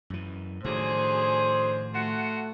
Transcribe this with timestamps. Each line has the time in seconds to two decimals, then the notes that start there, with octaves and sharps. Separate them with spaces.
0.10 F#2 E3
0.64 A2 D3 D#3 F3 F#3 G#4 C5
1.94 A3 F4 F#4 F#5